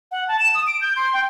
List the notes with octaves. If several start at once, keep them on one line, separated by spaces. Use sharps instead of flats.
F#5
A5
E7
D#6
D7
G6
C6
G5